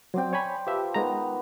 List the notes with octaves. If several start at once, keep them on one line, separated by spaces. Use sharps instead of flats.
F#3 C4 C5 D5 G5
C#5 G#5 B5
F3 F4 G4 B4 E5
D#3 G#3 B3 A#5